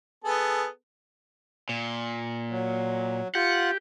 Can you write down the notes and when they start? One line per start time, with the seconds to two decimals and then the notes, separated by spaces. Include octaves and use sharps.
0.24 B3 G#4 A4
1.69 A#2
2.51 F#3
3.35 F4 G4 F#5